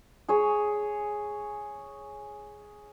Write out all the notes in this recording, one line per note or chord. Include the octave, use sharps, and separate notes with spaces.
G#4 C#5